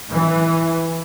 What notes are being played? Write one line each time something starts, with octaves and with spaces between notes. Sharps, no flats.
E3